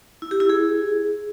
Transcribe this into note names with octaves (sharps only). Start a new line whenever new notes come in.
E4
G4
E4
G#4